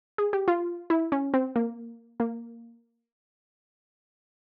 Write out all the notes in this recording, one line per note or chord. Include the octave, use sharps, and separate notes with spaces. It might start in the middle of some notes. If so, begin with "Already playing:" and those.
G#4
G4
F4
E4
C#4
C4
A#3
A#3